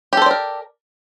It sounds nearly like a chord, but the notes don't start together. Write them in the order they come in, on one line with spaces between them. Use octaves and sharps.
G4 A4 C5 D5 A#4